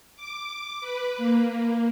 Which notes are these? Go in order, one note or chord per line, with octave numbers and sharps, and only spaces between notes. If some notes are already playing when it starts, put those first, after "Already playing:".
D6
B4
A#3